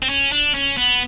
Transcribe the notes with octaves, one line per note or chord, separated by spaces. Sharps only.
C4
C#4
D4
C#4
B3